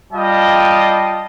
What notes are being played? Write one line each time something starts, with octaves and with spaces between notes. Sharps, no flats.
G3 F4 D#5 G5 A5